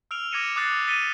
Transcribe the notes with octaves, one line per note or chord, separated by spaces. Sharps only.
E6 F6 D7 F7
D6 G#6 A#6 C#7 D#7 E7
D6 D#6 F#6 A6 C7 F7
A6 B6 C#7 D#7 G7